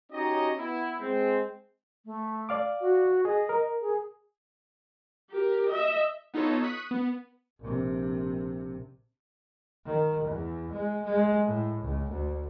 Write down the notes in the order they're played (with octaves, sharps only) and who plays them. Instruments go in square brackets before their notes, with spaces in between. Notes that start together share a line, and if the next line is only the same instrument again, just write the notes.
[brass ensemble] C#4 D#4 F#4 G4 C#5 D#5
B3 E4
G#3 C4
[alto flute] A3
[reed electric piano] D5 F5 D6
[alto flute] F#4
[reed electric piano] G#4 [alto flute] D#5
[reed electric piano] A#4
[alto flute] G#4
[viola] G4 A#4
D#5 E5
[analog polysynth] B3 D#4 F4 A4 C#5
C#6 D#6 F#6 B6 D#7
B3
[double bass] A#1 C3
D#3
E2
G#3
G#3
A2
C#2
D2